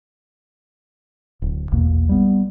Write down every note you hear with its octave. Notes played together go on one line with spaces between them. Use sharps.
D1
A#1 E2 B2 A#3
G3 B3